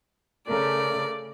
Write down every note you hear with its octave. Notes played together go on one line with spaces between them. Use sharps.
C#3 A3 A#4 D5